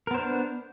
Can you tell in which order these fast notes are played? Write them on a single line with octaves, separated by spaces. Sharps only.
A#4 B3 C5 D4